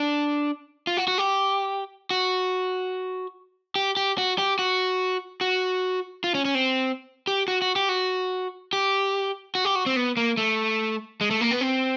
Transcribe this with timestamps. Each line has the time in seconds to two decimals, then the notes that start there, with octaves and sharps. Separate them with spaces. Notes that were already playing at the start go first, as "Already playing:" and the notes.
Already playing: D4
0.87 F4
0.97 F#4
1.08 F#4
1.18 G4
2.11 F#4
3.76 G4
3.97 G4
4.18 F#4
4.38 G4
4.59 F#4
5.41 F#4
6.24 F4
6.35 C#4
6.45 C#4
6.55 C4
7.27 G4
7.48 F#4
7.62 F#4
7.76 G4
7.89 F#4
8.73 G4
9.55 F#4
9.65 G4
9.76 F#4
9.86 C4
9.96 B3
10.17 A#3
10.37 A3
11.21 G#3
11.31 A3
11.41 A#3
11.51 B3
11.61 C4